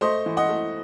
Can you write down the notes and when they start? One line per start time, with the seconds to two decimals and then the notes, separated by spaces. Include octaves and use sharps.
0.01 A3 C5 D#5
0.26 E3
0.37 D#5 F#5
0.49 A3